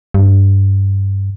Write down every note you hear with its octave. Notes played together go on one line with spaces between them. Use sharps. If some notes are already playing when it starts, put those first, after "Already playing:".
G2